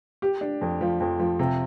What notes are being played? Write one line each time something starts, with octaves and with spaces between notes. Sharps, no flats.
G4
D4
F2
F3
F2
F3
C3